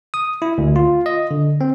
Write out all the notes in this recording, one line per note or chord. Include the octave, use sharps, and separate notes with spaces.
D#6
E4
D2
F4
D#5
D3
C4